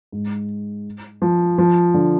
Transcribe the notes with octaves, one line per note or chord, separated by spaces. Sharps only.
G#2
F3
F3
D3